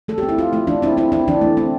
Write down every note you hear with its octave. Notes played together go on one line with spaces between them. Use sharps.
A3 A4
G4
C4
E4
C4 F4
A3 E4
E3 D4
C4 E4
C4 E4
C4 E4
E3 D4
A3
C4